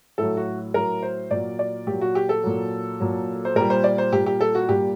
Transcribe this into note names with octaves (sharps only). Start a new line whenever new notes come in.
A2 F#3 A4
F#4
A2 F#3 A#4
C5
A#2 F#3 D5
D5
A#2 F#3 G4
F#4
G4
A4
A#2 F#3
A#2 F#3
C5
A#2 G3 A#4
C5
D5
C5
A#2 G3 G4
G4
A4
F#4
A#2 G3 G4